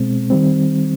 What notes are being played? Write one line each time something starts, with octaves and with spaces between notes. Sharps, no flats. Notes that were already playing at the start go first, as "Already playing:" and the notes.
Already playing: B2 G#3 C4
D#3 G3 C4